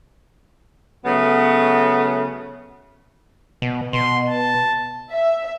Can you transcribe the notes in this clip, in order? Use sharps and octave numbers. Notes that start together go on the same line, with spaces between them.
C#3 F#3 A3 B3
B2
B2 C6
A5
E5